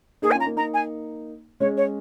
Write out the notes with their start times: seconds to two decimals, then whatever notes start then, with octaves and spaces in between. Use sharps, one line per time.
0.22 A#3 D#4 G#4
0.31 G#5
0.34 C#4 F4
0.40 A#5
0.46 A#3 D#4
0.57 A#3 D#4 A#5
0.74 G#5
1.60 G#3 C#4 C#5
1.77 C#5